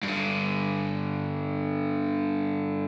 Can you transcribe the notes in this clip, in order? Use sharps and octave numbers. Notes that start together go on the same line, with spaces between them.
G2 D3